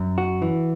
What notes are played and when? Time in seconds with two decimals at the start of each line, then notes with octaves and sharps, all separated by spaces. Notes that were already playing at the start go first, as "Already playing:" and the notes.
Already playing: F#2
0.18 F#4
0.42 E3